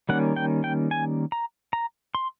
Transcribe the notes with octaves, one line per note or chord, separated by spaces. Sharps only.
D#3 G3 A#3 C#4 F#5
G5
G5
G#5
A#5
A#5
C6